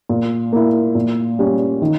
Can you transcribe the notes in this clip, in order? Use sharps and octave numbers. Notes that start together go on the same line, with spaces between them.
A#2
A#3 E4
A#2
G3 C#4
D#3